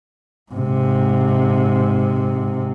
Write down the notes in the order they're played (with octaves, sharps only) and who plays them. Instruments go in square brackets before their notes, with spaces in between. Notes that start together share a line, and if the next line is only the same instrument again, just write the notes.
[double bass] G#2 C3